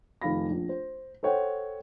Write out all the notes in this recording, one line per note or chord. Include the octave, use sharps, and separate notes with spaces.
F1 D#3 F5 B5 A#6
A#1
C5
A4 C5 C#5 F#5 G5